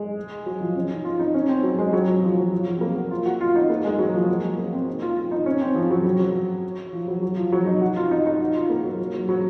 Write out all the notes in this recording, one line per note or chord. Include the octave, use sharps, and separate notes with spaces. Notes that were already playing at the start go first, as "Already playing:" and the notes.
Already playing: G#3
F#3
F3
C#4
D#4
F4
D#4
C#4
C4
F#3
G#3
F#3
F#3
F3
F#3
F3
F#3
C4
A#3
F#4
F4
F#4
F4
D#4
A#3
G#3
F#3
F3
F#3
G#3
A#3
C4
D#4
F4
F4
D#4
C#4
C4
F3
F#3
F#3
F#3
F3
F#3
F#3
F3
F#3
D#4
F#4
F4
D#4
D#4
F#4
F4
A#3
F#3
F#3
F#3
F#3